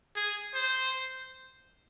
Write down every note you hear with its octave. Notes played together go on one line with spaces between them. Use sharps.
G#4
C5